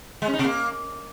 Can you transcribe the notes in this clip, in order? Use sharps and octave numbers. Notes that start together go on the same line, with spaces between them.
G#3
C#4
D#4
C3
A#3